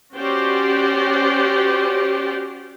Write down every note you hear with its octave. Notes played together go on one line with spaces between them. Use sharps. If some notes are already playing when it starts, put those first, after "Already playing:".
C#4 F#4 G4 C5 D5